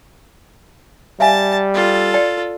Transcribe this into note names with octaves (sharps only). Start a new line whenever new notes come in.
G3 E5 F5 G#5 A5
F4 A4
D5 G5